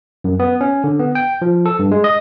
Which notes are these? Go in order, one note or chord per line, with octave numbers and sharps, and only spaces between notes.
F#2
B3
C#4
D3
B3
G5
F3
A4
G2
G#3
D#5